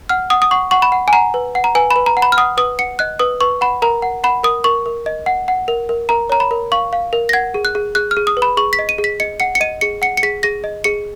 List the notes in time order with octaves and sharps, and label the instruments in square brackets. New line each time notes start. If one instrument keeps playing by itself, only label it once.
[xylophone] F#5 F6
F#5 D#6
D#6
F#5 C#6
F#5 C#6
B5
F#5
G#5
F#5 A#5
B4
F#5
A#5
B4 G#5
B5
B4
A#5
F#5
B5
F6
F#5 D#6
B4 D#6
F#5 C#7
D#5 F#6
B4 D#6
B4 C#6
F#5 B5
A#4 A#5
F#5
F#5 B5
A#4 D#6
A#4 C#6
A#4
D#5
F#5
F#5
A#4
A#4
A#4 A#5
C#5 A#5
B5
A#4
F5 C#6
F5
A#4
A#6
F#5 G#6
G#4
F#6
G#4
G#4 F#6
F6
G#4
D#6
B4
B5
G#4 C#6
B6
D#5
D#7
G#4
B6
D#5 C#7
F#5 C#7
C#7
D#5 D#7
G#4 C#7
F#5 C#7
C#7
G#4 B6
G#4 A#6
D#5
G#4 C#7